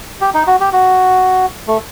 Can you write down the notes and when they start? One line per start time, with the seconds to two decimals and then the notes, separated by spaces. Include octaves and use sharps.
0.21 G4
0.34 D#4
0.47 F#4
0.60 G4
0.73 F#4
1.68 A3